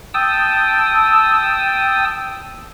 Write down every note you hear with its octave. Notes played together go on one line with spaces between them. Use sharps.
G5 A5 D#6 E6